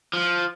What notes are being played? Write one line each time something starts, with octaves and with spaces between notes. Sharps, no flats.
F3